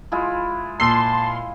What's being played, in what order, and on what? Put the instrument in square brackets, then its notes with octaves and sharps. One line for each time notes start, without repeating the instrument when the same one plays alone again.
[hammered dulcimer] G#3 E4 F4
[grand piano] A#2 E6 C7 [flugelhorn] A5 [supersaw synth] C6